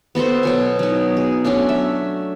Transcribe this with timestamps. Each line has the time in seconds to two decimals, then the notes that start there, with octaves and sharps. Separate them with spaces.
0.15 B3 F#4 A4 C5
0.43 B2 F#3 G#5
0.79 F#3 D#4
1.17 G#4
1.44 F#3 A3 C#4 D4
1.69 E5